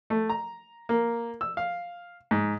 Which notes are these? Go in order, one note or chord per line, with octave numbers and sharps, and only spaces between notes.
A3
A#5
A#3
E6
F5
G#2